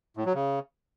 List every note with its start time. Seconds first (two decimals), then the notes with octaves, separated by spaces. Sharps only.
0.17 A2
0.26 F#3
0.34 C#3